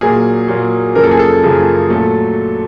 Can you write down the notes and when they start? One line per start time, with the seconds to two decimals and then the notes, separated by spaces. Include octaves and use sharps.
0.01 A#2 F#3 A#3 G#4
0.48 A#2 F#3 A#3
0.95 F#2 C#3 F3 A#3 A#4
1.03 A4
1.11 G#4
1.19 A4
1.43 F#2 C#3 F3 A#3
1.90 A#2 F#3 A3